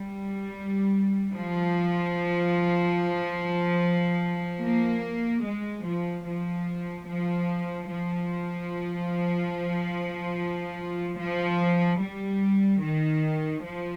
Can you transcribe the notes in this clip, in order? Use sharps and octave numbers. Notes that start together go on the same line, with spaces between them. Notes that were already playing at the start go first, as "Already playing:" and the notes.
Already playing: G3
F3
A#3
G#3
F3
F3
F3
F3
F3
G3
D#3
F3